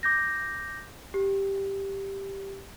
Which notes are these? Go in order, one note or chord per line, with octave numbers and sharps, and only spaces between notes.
D6 G6 A#6
G4